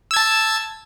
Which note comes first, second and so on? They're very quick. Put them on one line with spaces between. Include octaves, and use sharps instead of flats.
E6 G#6 A5